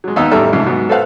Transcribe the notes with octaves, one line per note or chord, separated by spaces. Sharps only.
F#3 G#3
D#2 B3 D#4 D#5 F5 E6
A1 E2 G3 A4 A#5 F6
C2 G#2 C#3 F3
G#2 F#3 B3
A4 B4 C5 F5 F#5 F#6